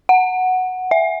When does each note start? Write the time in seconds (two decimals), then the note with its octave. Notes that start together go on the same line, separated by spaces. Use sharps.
0.09 F#5
0.91 E5